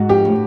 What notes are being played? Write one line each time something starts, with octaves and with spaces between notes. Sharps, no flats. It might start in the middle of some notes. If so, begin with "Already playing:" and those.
Already playing: G#2 F#4
F3 G4
A2